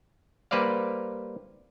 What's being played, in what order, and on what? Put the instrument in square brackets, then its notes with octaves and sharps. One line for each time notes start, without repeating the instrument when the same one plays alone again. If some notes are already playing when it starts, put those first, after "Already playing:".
[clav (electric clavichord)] G3 A#3 B4 C5 D5 F5